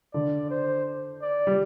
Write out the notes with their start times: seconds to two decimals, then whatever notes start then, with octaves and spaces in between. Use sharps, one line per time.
0.13 D3 D5
0.50 C5
1.22 D5
1.47 G3